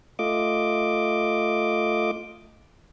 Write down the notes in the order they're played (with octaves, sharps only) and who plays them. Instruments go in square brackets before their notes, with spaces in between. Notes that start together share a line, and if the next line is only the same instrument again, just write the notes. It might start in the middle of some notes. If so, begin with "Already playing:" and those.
[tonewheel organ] A3 F4 D#5 D6